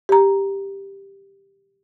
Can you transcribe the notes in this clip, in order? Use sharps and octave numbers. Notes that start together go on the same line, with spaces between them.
G4 A#5